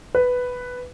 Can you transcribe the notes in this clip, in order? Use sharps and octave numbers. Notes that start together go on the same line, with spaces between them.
B4